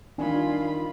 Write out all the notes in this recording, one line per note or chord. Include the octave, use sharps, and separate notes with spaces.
D#3 D4 F4 G#5 B5